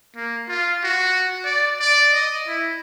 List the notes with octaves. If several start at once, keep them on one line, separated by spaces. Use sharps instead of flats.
A#3
F4
F#4
D5
D5
D#5
E4